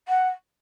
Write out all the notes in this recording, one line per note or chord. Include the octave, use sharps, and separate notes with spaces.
F#5